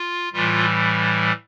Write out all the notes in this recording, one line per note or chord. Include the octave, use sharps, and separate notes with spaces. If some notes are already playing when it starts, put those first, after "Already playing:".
Already playing: F4
A2 E3 G3 F4